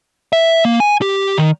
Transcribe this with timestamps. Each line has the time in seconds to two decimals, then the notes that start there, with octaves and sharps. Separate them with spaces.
0.33 E5
0.65 A#3
0.80 G#5
1.02 G4
1.38 D#3